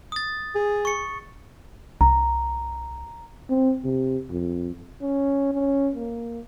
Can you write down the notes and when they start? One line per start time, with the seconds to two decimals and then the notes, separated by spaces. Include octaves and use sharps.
0.12 D#6 A6
0.55 G#4
0.85 C#6 C#7
2.01 C2 A#5
3.50 C4
3.84 C3
4.30 F2
5.02 C#4
5.53 C#4
5.95 A#3